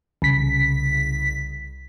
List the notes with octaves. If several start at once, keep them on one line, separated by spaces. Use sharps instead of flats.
C2 C#3 B6